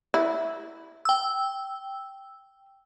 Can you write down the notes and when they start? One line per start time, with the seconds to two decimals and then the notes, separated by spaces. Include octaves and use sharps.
0.14 E4
1.05 G5 E6